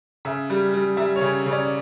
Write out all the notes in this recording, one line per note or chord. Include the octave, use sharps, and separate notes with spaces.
C#3 E5
G3
G3
G3 E5
C#5
C#3
C#3 C#5
D5